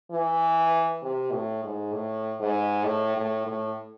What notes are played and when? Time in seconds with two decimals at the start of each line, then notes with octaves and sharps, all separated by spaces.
0.11 E3
1.03 C3
1.33 A2
1.64 G#2
1.94 A2
2.40 G#2
2.85 A2
3.17 A2
3.46 A2